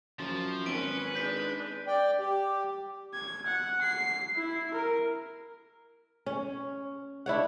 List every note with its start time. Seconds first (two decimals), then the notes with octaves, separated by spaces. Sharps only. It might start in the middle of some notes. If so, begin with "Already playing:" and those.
0.19 F#2 F3
0.66 G#1 C#4 B4 D7
1.15 G#3 D4 G6 B6
1.87 D5 G5
2.19 G4
3.14 G#6
3.47 F#5
3.82 C7
4.36 E4
4.74 A#4
6.26 C#4
7.26 D4 E4 C#5 F#5